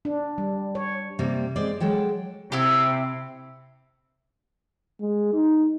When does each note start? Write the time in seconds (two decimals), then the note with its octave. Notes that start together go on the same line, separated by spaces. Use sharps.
0.05 D4
0.38 G3
0.75 C#5
1.19 C3 G3 A#3
1.56 G#3 C4 D5
1.80 F#3 G#3 A4 G5
2.52 C3 E4 G4
5.01 G#3
5.33 D#4